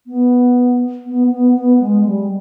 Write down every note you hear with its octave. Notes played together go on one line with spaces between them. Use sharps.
B3
B3
B3
B3
G#3
G3